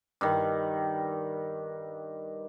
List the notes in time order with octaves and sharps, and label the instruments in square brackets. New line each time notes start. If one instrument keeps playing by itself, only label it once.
[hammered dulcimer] G2 D#3